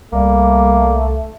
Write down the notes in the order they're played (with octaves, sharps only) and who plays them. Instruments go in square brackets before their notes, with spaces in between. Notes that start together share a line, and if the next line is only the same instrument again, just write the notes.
[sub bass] C2 [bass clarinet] G3 [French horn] A3 [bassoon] A#3